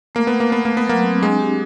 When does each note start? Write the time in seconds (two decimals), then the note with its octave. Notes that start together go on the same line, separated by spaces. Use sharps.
0.15 A3 A#3
0.27 B3
0.33 A3
0.40 A#3
0.50 A3 B3
0.65 A3 A#3
0.77 B3
0.87 F#3 A#3
1.04 C4
1.21 G#3 D4
1.39 G4